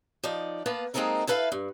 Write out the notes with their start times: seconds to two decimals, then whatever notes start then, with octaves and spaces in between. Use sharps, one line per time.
0.23 F3 D#4 D5
0.66 A#3 B3 B4 F5 A5
0.94 G#3 A#3 C4 D#4 A4 A#4
1.27 E4 A4 B4 E5 F5
1.52 G2